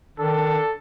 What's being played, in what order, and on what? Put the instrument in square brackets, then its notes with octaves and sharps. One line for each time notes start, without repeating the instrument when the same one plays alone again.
[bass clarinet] D#3 [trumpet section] D4 A4